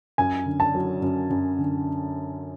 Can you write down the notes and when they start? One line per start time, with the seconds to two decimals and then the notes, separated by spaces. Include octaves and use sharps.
0.18 F#2 G#5
0.46 D3
0.60 A5
0.75 F#3
1.02 F#2
1.30 F#2
1.59 D3